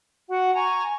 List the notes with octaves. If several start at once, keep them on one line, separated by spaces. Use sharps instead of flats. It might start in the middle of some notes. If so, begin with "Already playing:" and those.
F#4 F#5
G#5 A#5 C#6